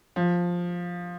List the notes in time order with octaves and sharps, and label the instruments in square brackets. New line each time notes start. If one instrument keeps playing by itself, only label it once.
[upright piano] F3